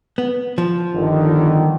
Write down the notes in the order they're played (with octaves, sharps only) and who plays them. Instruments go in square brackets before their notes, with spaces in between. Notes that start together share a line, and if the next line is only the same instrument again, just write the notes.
[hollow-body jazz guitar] B3
F3
[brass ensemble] G1 D3 D#3